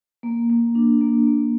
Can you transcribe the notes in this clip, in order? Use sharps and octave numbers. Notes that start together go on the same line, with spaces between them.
A#3
A#3
D4
A#3
A#3